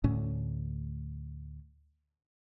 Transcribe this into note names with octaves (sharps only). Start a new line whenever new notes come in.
D2 A2 C#4